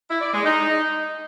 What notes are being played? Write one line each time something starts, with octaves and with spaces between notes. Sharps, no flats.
E4
D5
G#3
D#4